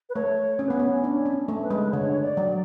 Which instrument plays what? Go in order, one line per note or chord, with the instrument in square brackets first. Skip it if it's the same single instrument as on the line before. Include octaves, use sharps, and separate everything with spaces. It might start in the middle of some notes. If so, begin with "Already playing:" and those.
[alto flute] B4
[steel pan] A3 [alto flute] C#5
[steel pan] C#4 [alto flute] C#5
[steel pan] B3 [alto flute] B4
[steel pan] C#4 [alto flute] C#5
[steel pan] D4 [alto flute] C#5
[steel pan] C#4
A3
[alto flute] B4
[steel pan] G#3
[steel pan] D3 [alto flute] C#5
[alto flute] D5
[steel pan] F#3